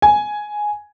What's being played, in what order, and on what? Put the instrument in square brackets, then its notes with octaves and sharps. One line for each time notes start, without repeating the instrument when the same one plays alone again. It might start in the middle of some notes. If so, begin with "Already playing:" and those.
[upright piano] G#5